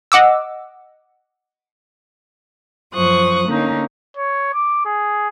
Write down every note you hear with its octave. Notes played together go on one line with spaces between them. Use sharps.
D#5 F#5 D6 E6
F#2 F3 C5 C#6 D#6 F#6
D3 A#3 C#4 D#4
C#5
D6
G#4